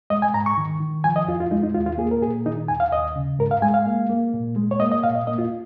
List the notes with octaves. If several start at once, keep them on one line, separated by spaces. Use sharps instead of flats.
G#3 D#5
G#5
G#2 A#5
C#6
D#3
D#3
F3 G#5
D#5
F2 F4
F4
G#3 D#4
D#4
D#2 F4
F4
A#3 G#4
A#4
A#2 G#4
D#3 D#4
D#2 G#5
F5
D#2 D#5
C#3
G#2 A#4
F5
G#3 G#5
F5
A#3
A#3
A#2
G#3
C#5
A#3 D#5
D#5
A#2 F5
D#5
A#3 D#5
F4